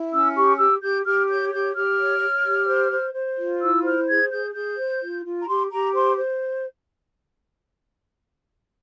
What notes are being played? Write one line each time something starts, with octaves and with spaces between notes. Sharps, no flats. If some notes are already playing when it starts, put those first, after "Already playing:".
Already playing: E4
C#4 E6
G4 C#6
G4 E6
G4 G6
G4 F6
C#5 G6
G4 G6
G4 F6
C#5
C#5
G4
C5
C5
C5
F4
E4 E6
C5 F6
G#4 G#6
G#4 G6
G#4 G6
C5
F4
F4
A#5
G4 C6
G4 A#5
C5 C6
C5